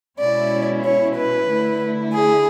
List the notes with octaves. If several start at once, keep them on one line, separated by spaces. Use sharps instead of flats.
B2 G#3 C#4 E4 D5
C#5
B4
D3 A3 E4
G#4